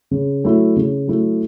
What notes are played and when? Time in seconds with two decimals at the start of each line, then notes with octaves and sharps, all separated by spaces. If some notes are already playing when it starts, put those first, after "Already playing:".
0.11 C#3
0.44 F#3 A3 E4
0.76 C#3
1.07 F#3 A3 E4